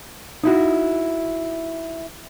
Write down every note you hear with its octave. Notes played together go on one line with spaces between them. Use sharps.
D#4 E4 F#4